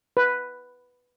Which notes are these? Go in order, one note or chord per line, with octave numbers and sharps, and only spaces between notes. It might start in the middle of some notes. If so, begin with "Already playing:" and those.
B4